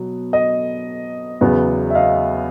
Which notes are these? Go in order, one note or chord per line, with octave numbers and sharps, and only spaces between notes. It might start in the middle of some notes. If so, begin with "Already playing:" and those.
Already playing: B2 F#3 B3
D#5
E2 C#3 F#3 B3
E5
D#5 F5